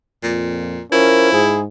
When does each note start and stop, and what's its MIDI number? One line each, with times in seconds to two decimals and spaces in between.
0.23 0.80 41
0.23 0.81 46
0.92 1.43 53
0.92 1.28 61
0.92 1.60 64
0.92 1.30 70
1.33 1.65 44
1.33 1.62 68